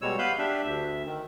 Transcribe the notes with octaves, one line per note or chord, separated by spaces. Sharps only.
B2 G3 G#3 C#5 E6
B3 B4 F5 B5 G6
D4 G4 E5
D2 E5
D#3